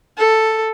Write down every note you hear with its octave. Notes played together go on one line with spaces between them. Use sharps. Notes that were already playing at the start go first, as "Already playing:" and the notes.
A4